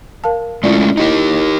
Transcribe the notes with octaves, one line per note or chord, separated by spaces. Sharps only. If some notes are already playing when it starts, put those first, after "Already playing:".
A#4 F5 A5
G#3 A3 C#4 E4 F4 D5
D#4 E4 G4 A#4 D#5